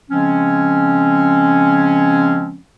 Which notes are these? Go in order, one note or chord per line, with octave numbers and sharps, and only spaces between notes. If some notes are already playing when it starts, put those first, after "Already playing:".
C#3 F3 G#3 C4 C#4